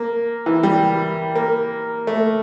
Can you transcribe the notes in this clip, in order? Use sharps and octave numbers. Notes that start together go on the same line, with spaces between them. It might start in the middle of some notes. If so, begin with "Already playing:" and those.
Already playing: A#3
E3
G3
A#3
A3